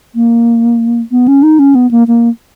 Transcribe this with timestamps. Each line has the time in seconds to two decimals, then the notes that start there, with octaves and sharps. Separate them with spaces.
0.15 A#3
1.11 B3
1.28 C#4
1.43 D#4
1.59 C#4
1.75 B3
1.91 A#3
2.08 A#3